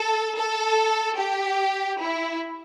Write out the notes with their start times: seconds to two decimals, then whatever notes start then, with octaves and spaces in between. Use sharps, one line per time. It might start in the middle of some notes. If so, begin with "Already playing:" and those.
Already playing: A4
0.37 A4
1.18 G4
2.01 E4